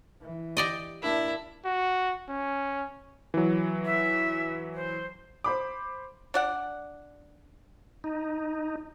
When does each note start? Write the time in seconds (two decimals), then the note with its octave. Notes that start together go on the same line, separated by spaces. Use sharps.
0.21 E3
0.57 G4 D5 D#5
1.02 A#3 D4 E4
1.65 F#4
2.29 C#4
3.34 E3 F#3
3.85 E5
4.75 C5
5.44 C5 B5 D6
6.34 D4 D5 F#5
8.04 D#4